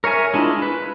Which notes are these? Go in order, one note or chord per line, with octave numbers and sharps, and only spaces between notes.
A#4 C#5 E5 G#5
G#3 D4 E4 F4
B4